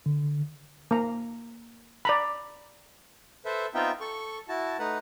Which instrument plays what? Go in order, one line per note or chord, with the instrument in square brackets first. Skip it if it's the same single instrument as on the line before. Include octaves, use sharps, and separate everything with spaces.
[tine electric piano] D3
[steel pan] A#3 A#5
D5 A#5 B5
[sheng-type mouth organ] A4 B4 C5 E5
B3 C4 D#4 F4 E5 G5
A4 C#6
E4 F#4 A5
A3 D#4 B4 F#5